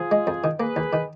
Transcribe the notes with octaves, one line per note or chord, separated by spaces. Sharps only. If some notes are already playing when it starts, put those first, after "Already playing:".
Already playing: F3 F4 G#4
G#3
F2
D#3
A#3 G#4 B4
D#2
D#3